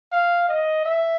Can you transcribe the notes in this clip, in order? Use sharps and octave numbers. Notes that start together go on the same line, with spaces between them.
F5
D#5
E5